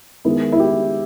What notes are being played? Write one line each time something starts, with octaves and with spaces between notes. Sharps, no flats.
D#3 G#3 B3 E4
E4
G4